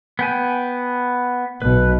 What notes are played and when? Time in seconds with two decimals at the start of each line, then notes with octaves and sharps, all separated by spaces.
0.19 B3 G5 G#5
1.62 B1 B2 B4